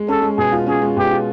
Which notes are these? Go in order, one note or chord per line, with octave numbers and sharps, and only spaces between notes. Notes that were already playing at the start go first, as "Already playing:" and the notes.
Already playing: G#3
C#4 A4
G#3
B2 G#4
F4
C#4 G#4
G#3
B2 G4
F4